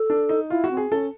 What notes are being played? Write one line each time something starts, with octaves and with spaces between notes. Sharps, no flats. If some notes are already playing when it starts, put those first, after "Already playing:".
Already playing: A4
D4
D#4
E4 F4
F#4
C4
G#4
C#4 A4